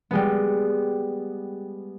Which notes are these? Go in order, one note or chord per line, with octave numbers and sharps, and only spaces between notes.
G3 G#3 B3